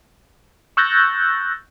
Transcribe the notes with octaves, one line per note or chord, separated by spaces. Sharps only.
C#6 E6 F#6 G6 A6 A#6